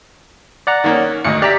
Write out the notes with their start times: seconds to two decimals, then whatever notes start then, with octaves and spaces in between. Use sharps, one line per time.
0.67 D5 F#5 A#5
0.84 D#3 A#3 C#4
1.25 G#1 D2 D#5 C#7
1.42 G4 D5 E5 A#5 B6